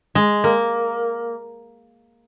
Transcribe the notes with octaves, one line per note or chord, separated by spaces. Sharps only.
G#3
A#3